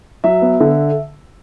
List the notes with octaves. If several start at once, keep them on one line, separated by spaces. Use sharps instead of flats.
F#3 E5
B3
D3 E5